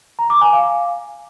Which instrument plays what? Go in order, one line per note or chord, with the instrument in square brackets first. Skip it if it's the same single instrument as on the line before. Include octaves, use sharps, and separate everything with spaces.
[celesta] A#5
D6
G#5
F5